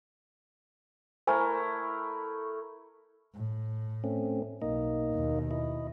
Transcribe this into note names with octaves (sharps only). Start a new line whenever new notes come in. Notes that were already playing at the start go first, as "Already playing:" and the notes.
A3 E4 A#4 C5 G#5
A2
A3 C4 C#4
B1 A#3 D#4 D#5
D#2 B2
E4 D#5